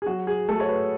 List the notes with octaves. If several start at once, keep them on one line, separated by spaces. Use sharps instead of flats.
G#4
F#3 F#4
G#4
A3 A4
C#5
B4